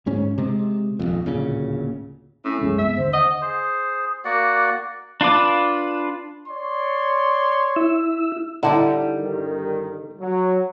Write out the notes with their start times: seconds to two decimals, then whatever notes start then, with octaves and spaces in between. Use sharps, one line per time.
0.06 D1 G#2 C#4
0.38 C3 G#3
0.99 D#1 G#1 F2
1.26 D1 A#2 C#3
2.45 A2 C#4
2.61 C2 F#2 E3 G#3
2.78 G2 B3 C4 E5
2.98 D#2 D3 C5
3.13 D#5 F#5
3.41 G#4 C5
4.25 A#3 F#4 D5 F#5
5.21 D4 F4 B4 D6
6.48 C#5 D5 C6
7.76 E4 E6
8.63 D3 G3 D#4 E4
9.18 G2 D#3
10.20 F#3